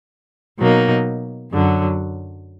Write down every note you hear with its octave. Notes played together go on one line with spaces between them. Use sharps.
B2 F#3 A#3 D#4
F#2 D3 F#3